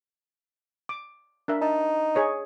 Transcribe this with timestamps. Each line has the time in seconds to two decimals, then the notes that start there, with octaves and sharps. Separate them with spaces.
0.89 D6
1.48 D4 A#4 E5
1.61 D#4 A5
2.15 G#4 C#5 D#5